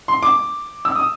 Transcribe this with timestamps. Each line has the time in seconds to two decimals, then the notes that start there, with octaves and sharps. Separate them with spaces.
0.08 C6
0.23 D6
0.85 E6
0.95 D#6